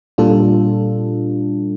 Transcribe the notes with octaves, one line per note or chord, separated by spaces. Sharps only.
A#2 G3 D4 F4 A4